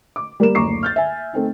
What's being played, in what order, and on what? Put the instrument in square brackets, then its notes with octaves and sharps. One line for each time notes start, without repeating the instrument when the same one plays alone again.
[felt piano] D6
G3 A#3 A#4 E7
F#1 D2 A#5 C#6 D6 C7
F6 G6 A6
E5 G#5
A3 C4 D#4